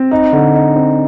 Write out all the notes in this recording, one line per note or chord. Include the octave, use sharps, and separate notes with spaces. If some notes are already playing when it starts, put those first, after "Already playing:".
Already playing: C4
D#4
D3
D#4
C4